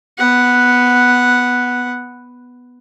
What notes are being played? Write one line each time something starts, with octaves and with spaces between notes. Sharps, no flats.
B3 F#5